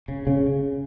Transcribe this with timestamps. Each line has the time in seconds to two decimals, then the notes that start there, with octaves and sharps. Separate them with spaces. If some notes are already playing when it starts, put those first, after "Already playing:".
0.08 C#3
0.27 C#3